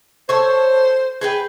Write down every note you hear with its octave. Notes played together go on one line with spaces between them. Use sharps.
A4 C5 C#5
G#4 B4 G5